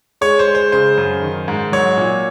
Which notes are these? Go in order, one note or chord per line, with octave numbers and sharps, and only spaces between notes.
G#3 C#5
C5
G#3
C5
C#3 C5
F#2
D#3
G#2
F#3 C#5
A#2